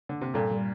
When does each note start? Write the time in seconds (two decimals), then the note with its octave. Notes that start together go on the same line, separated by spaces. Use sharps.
0.09 D3
0.21 C3
0.34 G2 A#2 A4
0.51 G3